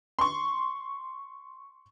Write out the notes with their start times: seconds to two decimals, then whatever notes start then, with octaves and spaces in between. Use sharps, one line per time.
0.19 C6 C#6